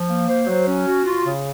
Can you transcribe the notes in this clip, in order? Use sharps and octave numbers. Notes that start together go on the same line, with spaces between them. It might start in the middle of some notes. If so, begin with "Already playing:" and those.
Already playing: F3
A#3
C5
F#3
C#4
F#4
F4
C#3